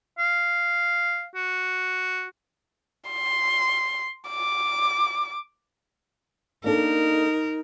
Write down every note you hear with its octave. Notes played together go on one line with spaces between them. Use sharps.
F5
F#4
C6
D6
A#3 D4 D#4 A4 A#4